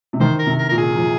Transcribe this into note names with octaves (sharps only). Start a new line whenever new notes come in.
C3
D#3 C5
A#4
C3
A#4
A#2 A#4
G#4
F3